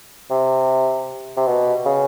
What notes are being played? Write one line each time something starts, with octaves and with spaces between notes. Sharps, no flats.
C3
C3
B2
C#3